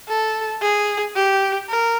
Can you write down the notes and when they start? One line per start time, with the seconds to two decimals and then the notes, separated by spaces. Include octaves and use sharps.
0.08 A4
0.62 G#4
1.16 G4
1.69 A#4